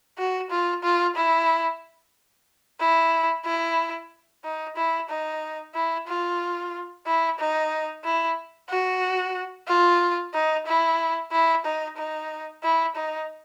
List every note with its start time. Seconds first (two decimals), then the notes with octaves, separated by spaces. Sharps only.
0.18 F#4
0.51 F4
0.83 F4
1.16 E4
2.80 E4
3.45 E4
4.44 D#4
4.77 E4
5.09 D#4
5.74 E4
6.08 F4
7.06 E4
7.39 D#4
8.04 E4
8.69 F#4
9.68 F4
10.34 D#4
10.66 E4
11.32 E4
11.65 D#4
11.97 D#4
12.63 E4
12.96 D#4